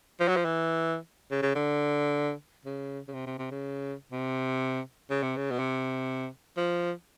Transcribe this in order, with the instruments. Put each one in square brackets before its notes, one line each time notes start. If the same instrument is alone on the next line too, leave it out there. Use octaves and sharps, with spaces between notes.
[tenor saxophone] F3
F#3
F3
E3
C#3
C#3
D3
C#3
C#3
C3
C3
C3
C#3
C3
C#3
C3
C#3
B2
C3
F3